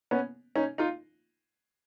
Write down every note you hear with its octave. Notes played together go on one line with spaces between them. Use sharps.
B3 C#4
C#4 D#4
D#4 F4